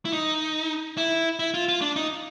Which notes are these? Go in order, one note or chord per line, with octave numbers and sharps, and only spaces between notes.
E4
D#4
E4
E4
F4
F4
D4
D#4